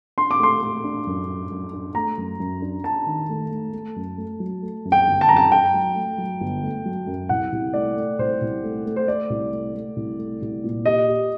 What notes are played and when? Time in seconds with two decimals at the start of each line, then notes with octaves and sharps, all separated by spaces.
0.18 D4 C6
0.31 D6
0.39 A3 C6
0.62 A3
0.84 D4
1.07 F#2
1.28 D4
1.51 F#2
1.73 D4
1.95 A3 A#5
2.18 F#2
2.40 F#2
2.62 D4
2.84 D4 A5
3.07 D#3
3.29 A3
3.51 A3
3.73 A3
3.96 F#2
4.18 A3
4.40 F#3
4.62 A3
4.85 F#2
4.92 G5
5.07 G1
5.21 A5
5.29 F#2 A#5
5.36 A5
5.52 F#2 G5
5.74 F#3
5.96 A3
6.18 F#3
6.40 G1
6.63 A3
6.85 F#3
7.07 F#2
7.29 C2 F#5
7.52 C2
7.73 A3 D5
7.96 A3
8.19 C2 C5
8.41 C2
8.63 A3
8.85 A3
8.96 C5
9.07 A3 D5
9.30 C2
9.52 A3
9.74 A3
9.96 C2
10.19 A3
10.42 C2
10.64 A#2
10.86 G4 D#5
11.08 G4